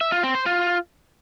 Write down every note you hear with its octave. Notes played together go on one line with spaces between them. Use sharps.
E5
F4
C4
C5
F4